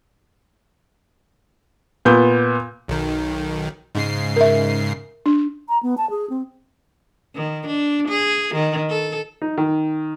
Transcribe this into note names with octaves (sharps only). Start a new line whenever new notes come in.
A#2 B3 G6
B1 D#3
G#2 C#3 C7
A#4 E5
D4
A#5
B3
A5
G#4
C4
D#3
D4
G#4
D#3
A4
D#4
D#3